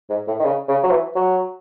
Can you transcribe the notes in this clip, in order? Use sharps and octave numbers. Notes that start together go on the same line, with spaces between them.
G#2
A2
D#3
C#3
C#3
F#3
E3
F#3